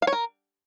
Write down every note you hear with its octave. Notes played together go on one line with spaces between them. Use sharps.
F5
C#5
A#4